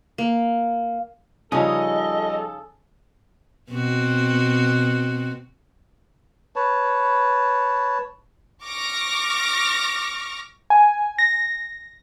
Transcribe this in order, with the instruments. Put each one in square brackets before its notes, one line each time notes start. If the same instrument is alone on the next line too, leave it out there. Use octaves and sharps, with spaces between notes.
[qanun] A#3
[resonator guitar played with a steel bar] C#3 D#4 G#5 [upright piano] F3 G3 C#4 [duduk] A4 [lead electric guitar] D#5
[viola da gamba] B2 C4 F#4
[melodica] B4 C#5 A5
[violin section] C#6 D6 F6 A#6
[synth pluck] G#5
A#6